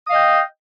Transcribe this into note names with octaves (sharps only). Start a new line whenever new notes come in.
D#5 F5 G5 D#6